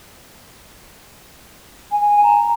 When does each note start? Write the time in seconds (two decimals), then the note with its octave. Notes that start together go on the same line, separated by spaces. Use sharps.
1.92 G#5
2.23 A#5